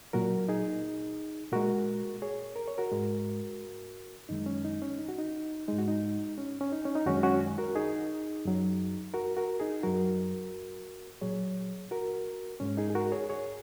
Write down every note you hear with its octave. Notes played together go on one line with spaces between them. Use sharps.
A#2 F#3 F#4 A#4
D#4 G#4
A#2 G#3 F#4 A#4
G#4 C#5
A#4
C#5
F#4 A#4
G#2 G#3
F#2 D#3 G#3 D#4
C#4
D#4
C#4
D#4
F#4
D#4
G#2 G#3 D#4
F#4
D#4
C#4
C#4
D#4
C#4
D#4
F#2 D#3 G#3 C#4 F#4
C#4 F#4
F#4 A#4
D#4 G#4
F#2 F#3
F#4 A#4
F#4 A#4
D#4 G#4
F#2 F#3 F#4 A#4
A#2 F#3 G#4 C#5
F#4 A#4
G#2 G#3 C#4
D#4 G#4
G#4
F#4 A#4
G#4 C#5
G#4 C#5